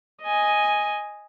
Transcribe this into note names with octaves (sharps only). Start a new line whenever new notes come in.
D#5 G#5